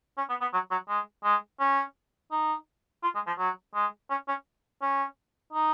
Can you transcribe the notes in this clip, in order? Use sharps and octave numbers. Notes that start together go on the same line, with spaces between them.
C#4
B3
B3
F#3
F#3
G#3
G#3
C#4
D#4
F4
G#3
F3
F#3
G#3
C#4
C#4
C#4
D#4